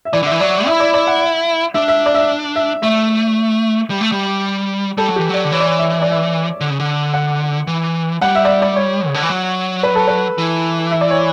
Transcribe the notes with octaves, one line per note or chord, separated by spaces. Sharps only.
E5
E3 D5
D3 E5
E3
F#3 D5
E4 E5
D5
D5
F#5
D4 E5
E5
D5
E5
E5
A3 E5
G3
A3
G3
G3 A4
F#3
G4
E3
F#3 D5
D3
E3 C#5
D5
C#5
E5
E5
D5
E5
D3
C#3
D3
F#5
E3
G3 F#5
E5
D5
E5
D5
C#5
C#3
D3
E3
F#3
B4
A4
B4
E3
E5
D5
C#5